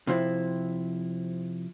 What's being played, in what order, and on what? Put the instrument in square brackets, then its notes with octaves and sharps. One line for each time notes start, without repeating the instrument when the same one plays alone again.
[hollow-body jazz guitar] C3 F3 C4 E4